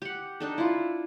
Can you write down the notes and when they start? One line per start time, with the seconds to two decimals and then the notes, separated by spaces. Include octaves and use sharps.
0.02 G4 F#5
0.40 D4 D#4 A4
0.58 E4 F4